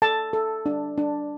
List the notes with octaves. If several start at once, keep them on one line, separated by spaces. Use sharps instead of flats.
A4 A5
A4
D4
D4